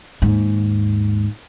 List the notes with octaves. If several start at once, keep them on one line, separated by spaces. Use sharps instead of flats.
D#2 G#2